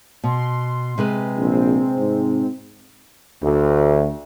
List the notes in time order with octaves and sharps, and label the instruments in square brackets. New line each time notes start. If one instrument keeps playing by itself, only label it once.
[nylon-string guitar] B2 [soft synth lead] C6
[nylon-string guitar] C3 G#3 B4
[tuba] A#1 [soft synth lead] C4
[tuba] G#2
[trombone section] D2